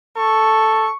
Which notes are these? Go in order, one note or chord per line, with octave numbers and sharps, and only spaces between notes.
A4 C#6